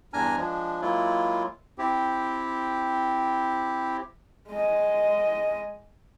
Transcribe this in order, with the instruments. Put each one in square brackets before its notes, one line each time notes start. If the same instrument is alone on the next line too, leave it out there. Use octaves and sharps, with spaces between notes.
[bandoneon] E2 G2 D4 G#5 A#5 F6
F3 G#3 D4
F#3 G#3 A#3 E4 F4
C4 E4 G4
[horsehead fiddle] G#3 D#5